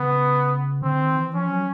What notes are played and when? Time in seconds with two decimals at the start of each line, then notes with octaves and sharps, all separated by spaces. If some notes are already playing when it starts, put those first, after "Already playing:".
Already playing: C#3 B3
0.82 D3 C4
1.00 D#3
1.16 E3
1.34 F3 C#4
1.51 F#3